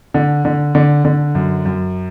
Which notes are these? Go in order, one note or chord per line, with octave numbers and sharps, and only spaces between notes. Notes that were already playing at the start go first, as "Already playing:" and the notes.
D3
D3
D3
D3
F#2
F#2